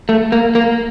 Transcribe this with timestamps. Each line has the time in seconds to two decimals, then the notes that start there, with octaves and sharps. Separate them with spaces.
0.09 A3
0.32 A#3
0.55 A#3